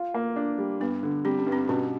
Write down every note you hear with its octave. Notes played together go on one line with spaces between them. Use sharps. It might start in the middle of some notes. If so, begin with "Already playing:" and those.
Already playing: F4
A#3
D4
G3
G2 B3
D3
G3 C4
C#4
G2
C4
B2 C#4